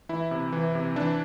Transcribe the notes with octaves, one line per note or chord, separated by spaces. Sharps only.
E3 E4
C3
E3
C3
E3 D4